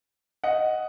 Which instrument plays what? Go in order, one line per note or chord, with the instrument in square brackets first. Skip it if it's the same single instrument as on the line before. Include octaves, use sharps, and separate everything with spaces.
[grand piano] D#5 F#5